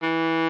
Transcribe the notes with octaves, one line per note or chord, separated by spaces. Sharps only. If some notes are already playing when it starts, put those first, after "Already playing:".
E3